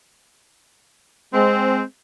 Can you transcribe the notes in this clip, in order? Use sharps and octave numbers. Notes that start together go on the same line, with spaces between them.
G#3 C4